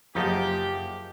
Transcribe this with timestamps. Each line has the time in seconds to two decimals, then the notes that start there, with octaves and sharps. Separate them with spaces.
0.15 F#1 F3 A#3 D#4 G4 G#4 F#5